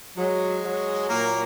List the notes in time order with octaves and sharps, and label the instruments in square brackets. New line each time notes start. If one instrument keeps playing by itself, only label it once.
[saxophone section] F#3 [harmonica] G#3 G#4
[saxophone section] F#3
[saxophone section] A#2 [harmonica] A#3 A#4